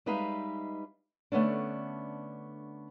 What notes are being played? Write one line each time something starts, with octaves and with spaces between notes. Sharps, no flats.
G3 G#3 D#4 B4 E5 F5
D3 A3 B3 C#4 D4